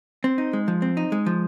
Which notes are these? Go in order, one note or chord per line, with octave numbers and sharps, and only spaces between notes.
C4
D#4
G#3
F3
C4
D#4
G#3
F3